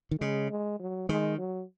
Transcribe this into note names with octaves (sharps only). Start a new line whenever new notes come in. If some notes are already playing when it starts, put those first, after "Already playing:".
D#3
C#3 G#3
G#3
F#3
D#3 G#3
F#3